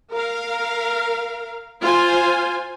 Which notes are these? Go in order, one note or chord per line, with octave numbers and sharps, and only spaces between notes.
A#4 F5
F4 C5 G#5